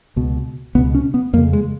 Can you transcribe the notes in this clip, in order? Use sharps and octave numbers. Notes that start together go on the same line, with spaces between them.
C#2 B2
C#2 B2 B3
C#4
B3
F2 C#3 A#3
G#3